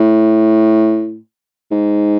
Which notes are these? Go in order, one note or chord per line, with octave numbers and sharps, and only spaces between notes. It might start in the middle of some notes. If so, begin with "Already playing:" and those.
Already playing: A2
G#2